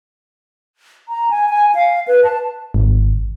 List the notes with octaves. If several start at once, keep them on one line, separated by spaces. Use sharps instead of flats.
A#5
G#5
G#5
F5
B4
A5
G#1